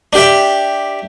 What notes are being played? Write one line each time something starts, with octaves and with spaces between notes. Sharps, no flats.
D4 G4 E5